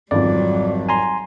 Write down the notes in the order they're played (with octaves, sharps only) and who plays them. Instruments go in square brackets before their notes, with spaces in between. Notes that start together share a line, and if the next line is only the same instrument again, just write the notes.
[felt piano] G#1 F2 [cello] F#3 G3 [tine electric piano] D5
[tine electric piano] G#5 A#5 C6